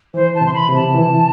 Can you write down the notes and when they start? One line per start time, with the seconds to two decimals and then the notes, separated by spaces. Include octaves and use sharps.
0.14 E3 C5
0.35 A5
0.41 C3 C6
0.54 B5
0.69 C3
0.75 A5
0.95 E3